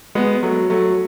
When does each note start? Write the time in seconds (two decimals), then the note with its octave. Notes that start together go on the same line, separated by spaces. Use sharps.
0.15 G#3 B3
0.43 F#3 A3
0.70 F#3 A3